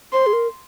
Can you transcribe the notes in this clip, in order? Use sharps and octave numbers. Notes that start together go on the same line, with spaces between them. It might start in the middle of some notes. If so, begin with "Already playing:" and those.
C5 C6
G#4
A#4